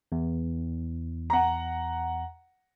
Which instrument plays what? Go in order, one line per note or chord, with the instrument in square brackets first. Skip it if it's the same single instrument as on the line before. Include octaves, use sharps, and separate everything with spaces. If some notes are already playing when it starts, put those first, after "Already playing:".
[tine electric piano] E2
[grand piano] F#5 A#5